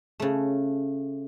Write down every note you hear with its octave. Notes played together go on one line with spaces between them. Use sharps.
C#3 A3